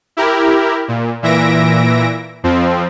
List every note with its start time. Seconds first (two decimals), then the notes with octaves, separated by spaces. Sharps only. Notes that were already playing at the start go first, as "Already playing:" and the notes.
0.17 E4 G4 A#4
0.88 A#2
1.22 A#2 E3 E5 A#6 D7
2.43 F2 F3 C4